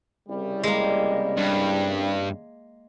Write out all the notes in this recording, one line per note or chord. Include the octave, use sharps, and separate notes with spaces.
C2 C#3 G3
G#3 A#3
G2